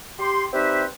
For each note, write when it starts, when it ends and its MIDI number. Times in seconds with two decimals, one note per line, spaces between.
0.19 0.44 67
0.19 0.44 84
0.53 0.84 55
0.53 0.84 60
0.53 0.84 63
0.53 0.84 67
0.53 0.84 71
0.53 0.84 76